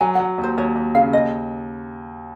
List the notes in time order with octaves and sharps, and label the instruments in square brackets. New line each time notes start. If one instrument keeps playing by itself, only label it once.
[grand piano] F#3 [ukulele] G#5
[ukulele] F#5
[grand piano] F#3
D#2
[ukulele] C5
[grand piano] D#2 [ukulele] C#5
[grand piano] D#2
[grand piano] C#3 [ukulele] F5
[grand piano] D#2 [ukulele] D#5